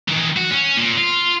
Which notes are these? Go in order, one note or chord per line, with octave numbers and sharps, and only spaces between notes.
D#3 E3
F#4
C#4
A#2
F4